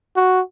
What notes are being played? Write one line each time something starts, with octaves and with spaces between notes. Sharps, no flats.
F#4